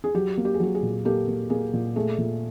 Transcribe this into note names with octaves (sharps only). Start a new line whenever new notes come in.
G#4
F#3 G4
A#3
G4
G#4
F#3 G4
G#4
A#2
A#3 G4 A4
A#3
A#3 G#4
A#2
A3 G#4
A#2